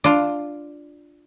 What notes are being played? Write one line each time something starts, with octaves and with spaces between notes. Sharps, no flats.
D4 F4